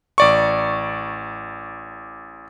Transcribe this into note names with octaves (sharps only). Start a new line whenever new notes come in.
A1 D5 C#6